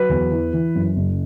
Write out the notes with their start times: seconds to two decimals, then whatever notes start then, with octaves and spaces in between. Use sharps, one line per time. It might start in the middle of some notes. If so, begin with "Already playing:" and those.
Already playing: F#3 B4
0.09 E2
0.32 E3
0.53 E3
0.75 F#2
0.96 F#1